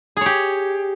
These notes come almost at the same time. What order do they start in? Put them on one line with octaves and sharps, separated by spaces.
G#4 C#5 G4